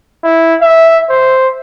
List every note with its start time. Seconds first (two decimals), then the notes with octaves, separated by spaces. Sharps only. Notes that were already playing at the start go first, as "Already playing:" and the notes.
0.24 E4
0.61 E5
1.09 C5